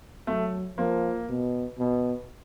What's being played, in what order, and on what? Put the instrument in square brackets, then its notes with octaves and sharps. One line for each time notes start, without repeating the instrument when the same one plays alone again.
[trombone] F#3 [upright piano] A3
[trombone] F3 [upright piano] A#3
[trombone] B2
B2